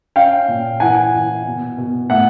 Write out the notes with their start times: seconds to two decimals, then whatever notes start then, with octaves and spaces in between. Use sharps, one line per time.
0.16 C#4 F5 G5
0.48 A#2
0.80 E3 F#5 G#5
1.13 E3
1.46 B2
1.78 B2
2.10 A2 E5 F#5